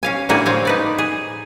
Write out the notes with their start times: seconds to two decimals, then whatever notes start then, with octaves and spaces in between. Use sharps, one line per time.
0.03 C#4 F5 G#5
0.29 A2 D3 G3 A#3 F#4 G#4
0.46 C4 C#5 F5
0.65 D#4 B4 D5
0.98 G#4